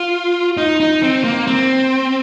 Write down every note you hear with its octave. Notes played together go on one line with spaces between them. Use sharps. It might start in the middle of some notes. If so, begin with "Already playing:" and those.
Already playing: F4
D#4
D#4
C4
A#3
C4